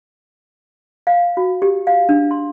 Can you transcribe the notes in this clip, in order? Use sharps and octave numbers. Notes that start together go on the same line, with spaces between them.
F5
F#4
G4
F5
D4
C6